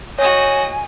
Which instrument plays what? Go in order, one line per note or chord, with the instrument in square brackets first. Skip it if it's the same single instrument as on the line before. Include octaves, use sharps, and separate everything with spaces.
[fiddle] F#4 D#5 [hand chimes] C#5 [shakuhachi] G#5